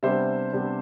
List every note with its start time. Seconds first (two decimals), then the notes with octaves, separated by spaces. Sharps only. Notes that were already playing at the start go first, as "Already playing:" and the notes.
0.03 C3 G3 B3 D4 C5 E5
0.53 C3 G3 B3 D4